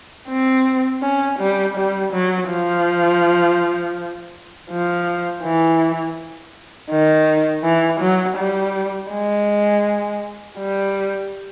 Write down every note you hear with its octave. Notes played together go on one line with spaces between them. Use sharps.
C4
C#4
G3
G3
F#3
F3
F3
E3
D#3
E3
F#3
G3
G#3
G3